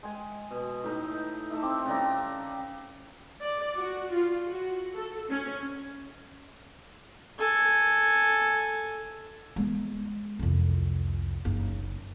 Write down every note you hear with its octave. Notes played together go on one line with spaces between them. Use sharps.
G#3 G#5
B2
A2 D#4
A3 D#4 E5
C4 D6
C#3 G3 A#5
D5
F#4
F4
F#4
A4
C#4
A4 G#5
G#3 B3
C2 F2
F#1 D#4